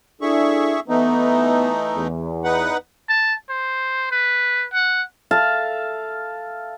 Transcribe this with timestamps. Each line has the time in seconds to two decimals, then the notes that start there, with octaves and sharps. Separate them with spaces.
0.22 D4 E4 G#4 A4 E5 C#6
0.89 E3 A3 B3 D#4
1.96 E2
2.44 D#4 B4 F#5
3.09 A5
3.49 C5
4.11 B4
4.73 F#5
5.31 A4 E5 F5 A5